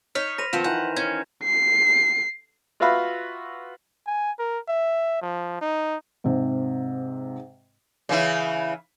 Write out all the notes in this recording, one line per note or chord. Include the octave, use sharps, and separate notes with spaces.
D#4 C#5 F6 B6
C5 B5 C6 A#6 D#7 F7
D#3 F3 B3 C4 F4 E7
D#3 E3 F#5 G6
C#4 G#6
C7
F4 F#4 B4 E5 F5 B5
G#5
A#4
E5
F3
D#4
G#2 C3
C#3 E3 E4